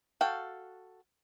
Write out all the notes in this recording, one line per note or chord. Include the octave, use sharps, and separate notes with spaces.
F#4 A4 F5 G5